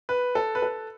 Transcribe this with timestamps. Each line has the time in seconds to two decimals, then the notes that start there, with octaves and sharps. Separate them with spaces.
0.09 B4
0.35 A4
0.55 B4
0.62 A4